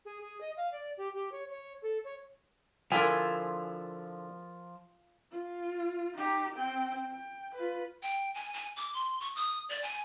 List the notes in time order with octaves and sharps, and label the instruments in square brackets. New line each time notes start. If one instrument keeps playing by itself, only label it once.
[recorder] G#4
G#4
D#5
F5
D5
G4
G4
C#5
C#5
A4
C#5
[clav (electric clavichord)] D3 E4 [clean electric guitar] F3 [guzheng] F4 G#4 [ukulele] A#4 G#5
[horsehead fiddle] F4
D#4 G4
C4 G5
G5
F4 B4
[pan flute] G5
G#5
G#5
D6
C6
C#6
D#6
D5
G#5